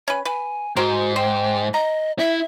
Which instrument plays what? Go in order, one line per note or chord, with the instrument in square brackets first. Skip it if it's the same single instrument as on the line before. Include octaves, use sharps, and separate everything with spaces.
[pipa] C#4 B4 [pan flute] G#5
[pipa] B4 [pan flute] G#5
[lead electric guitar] G#2 [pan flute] F#4 [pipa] A#4 C5 G5
[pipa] C5 [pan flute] G5
[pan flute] D#5 [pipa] A#5
[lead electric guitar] E4 [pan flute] E5